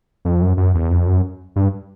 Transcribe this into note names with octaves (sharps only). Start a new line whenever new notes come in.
F2
F#2
F#2
E2
F2
F#2
G2